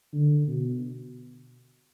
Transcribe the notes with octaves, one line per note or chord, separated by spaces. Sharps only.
D3
B2